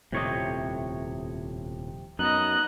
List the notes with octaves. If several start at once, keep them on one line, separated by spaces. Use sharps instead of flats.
D#1 F2 A2 C3 C#5 D#5
F#2 B3 D#4 D#5 F#6